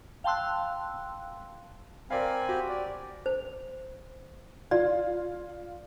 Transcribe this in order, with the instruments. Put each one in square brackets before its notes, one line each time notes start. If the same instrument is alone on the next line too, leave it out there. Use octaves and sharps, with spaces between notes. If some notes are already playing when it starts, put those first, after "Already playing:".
[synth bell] F5 G5 A5 C6 E6 F#6
[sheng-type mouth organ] C4 G#5 B5 [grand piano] A#4 D5 F5
[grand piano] F#4 G4
[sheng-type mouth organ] D5
[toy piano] C5
[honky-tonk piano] F4 [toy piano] D5